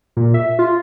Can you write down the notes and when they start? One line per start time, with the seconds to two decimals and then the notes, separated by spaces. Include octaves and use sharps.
0.17 A#2
0.34 E5
0.59 F4